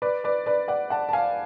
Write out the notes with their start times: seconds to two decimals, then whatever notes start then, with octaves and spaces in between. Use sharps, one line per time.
0.02 B4 D5
0.24 B4 D5
0.46 B4 D5
0.68 D5 F#5
0.90 F#5 A5
1.09 A5
1.13 F5 G#5